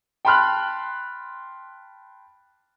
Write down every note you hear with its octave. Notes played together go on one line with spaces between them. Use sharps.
G5 A5 B5 C6 F6 F#6